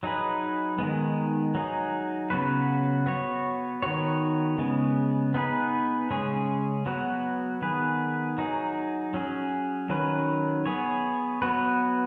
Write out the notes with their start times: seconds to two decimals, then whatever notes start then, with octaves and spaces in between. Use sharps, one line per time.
0.03 F#3 D#4 G#4 B4
0.78 D#3 G#3 B3
1.55 F#3 D#4 G#4
2.30 C#3 F#3 B3 F#4 B4
3.06 B3 F#4 C#5
3.82 D#3 B3 F#4 C#5
4.58 C#3 G#3 B3
5.34 B3 D#4 G#4 B4
6.11 C#3 G#3 C#4 G#4
6.86 F#3 B3 F#4 B4
7.62 D#3 B3 G#4 B4
8.38 F#3 D#4 G#4
9.14 F#3 C#4 G#4
9.89 D#3 F#3 C#4 B4
10.66 B3 G#4 C#5
11.42 F#3 B3 F#4 B4